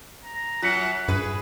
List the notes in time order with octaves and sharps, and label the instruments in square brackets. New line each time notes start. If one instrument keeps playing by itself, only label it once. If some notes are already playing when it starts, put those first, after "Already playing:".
[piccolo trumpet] A#5
[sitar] F#2 [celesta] F4 B6 C#7 [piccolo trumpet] F#6
[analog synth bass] G2 [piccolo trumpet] G#4 [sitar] B4